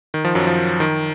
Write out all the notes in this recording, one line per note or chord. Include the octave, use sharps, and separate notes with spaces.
D#3
F3
F#2 F#3
F3
D#3